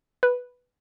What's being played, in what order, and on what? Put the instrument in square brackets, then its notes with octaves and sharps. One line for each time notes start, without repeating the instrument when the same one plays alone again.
[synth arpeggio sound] B4